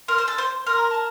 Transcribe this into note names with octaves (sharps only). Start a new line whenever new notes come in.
A#4 C6
C5
A4
C5
A#4 C6
A#5
A5